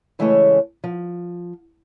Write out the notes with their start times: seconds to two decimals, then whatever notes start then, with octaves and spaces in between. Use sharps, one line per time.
0.19 C#3 E3 G#3 A3 A4 C#5
0.84 F3